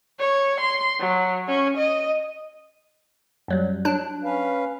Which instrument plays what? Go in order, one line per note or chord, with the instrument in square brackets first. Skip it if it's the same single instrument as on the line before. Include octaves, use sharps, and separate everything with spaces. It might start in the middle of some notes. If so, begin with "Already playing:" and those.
[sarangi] C#5
C6
F#3
C#4
D#5
[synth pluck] F#2 F#3 G3
F#3 D4 F#6
[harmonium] C#4 B4 F5